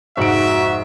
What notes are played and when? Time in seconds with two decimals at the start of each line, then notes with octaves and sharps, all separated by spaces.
0.17 F1 G#2 F#4 E5 F#5 A#6 D7